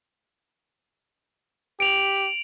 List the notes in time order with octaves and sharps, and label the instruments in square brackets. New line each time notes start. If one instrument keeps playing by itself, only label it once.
[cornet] G4 [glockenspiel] D7 F7 F#7